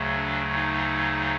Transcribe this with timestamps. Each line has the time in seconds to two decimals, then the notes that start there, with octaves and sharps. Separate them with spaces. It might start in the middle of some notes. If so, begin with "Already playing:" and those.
Already playing: D2 C#3 F#3 A3
0.16 D4
0.55 D#4